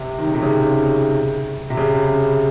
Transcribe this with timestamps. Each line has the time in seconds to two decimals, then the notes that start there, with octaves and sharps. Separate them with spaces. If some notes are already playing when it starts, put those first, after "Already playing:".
Already playing: C3
0.18 D#3
0.27 C#3
0.35 C3
0.43 C#3
1.70 C3
1.77 C#3